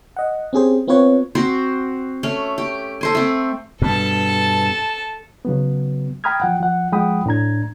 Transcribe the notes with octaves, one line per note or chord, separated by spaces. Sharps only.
D#5 F#5
C4 C#4 G4 G#4 C5
B3 C4 F4 B4 C#5
C4 F#4 C5
A3 C#4
G4
A4 C5 G#5
A3 C4
G2 B2 A4 A5
C#3 F#3 B3
G5 A#5 B5 D#6 F6 G#6
F3 F#5 G5
F3 F#5
F3 G#3 F#5 G5 B5 D#6
A2 D4 A#5 G#6